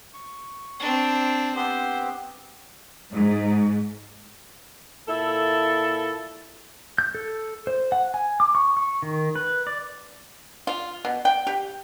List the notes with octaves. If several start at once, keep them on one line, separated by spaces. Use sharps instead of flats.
C#6
C4 D4
B3 C4 G4 C5
G#2
A#2 E4 A4
G6
A4
C5
F#5
G#5
D6
C#6
C#6
D#3
B4
D5
F4
B2
G5
G4